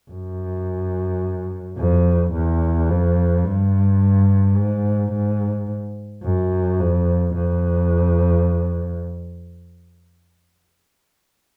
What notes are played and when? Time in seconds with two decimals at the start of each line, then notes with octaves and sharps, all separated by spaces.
0.11 F#2
1.78 F2
2.33 E2
2.90 F2
3.44 G2
4.56 G#2
5.13 G#2
6.24 F#2
6.79 F2
7.35 F2